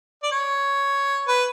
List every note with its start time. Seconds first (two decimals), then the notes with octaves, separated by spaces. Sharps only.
0.23 D5
0.32 C#5
1.28 B4